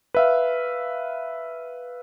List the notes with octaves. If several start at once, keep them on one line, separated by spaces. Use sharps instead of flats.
B4 E5 F5